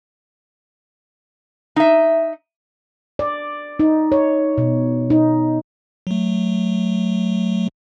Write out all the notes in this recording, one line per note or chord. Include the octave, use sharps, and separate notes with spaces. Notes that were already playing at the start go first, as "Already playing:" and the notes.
D#4 E5
D5
D#4
C#5
B2
D#4
F#3 A3